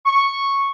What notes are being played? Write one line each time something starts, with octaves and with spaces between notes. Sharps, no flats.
C#6